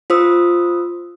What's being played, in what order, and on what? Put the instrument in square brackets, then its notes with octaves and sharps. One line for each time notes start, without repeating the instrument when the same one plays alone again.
[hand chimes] F4 C5 D#6 E6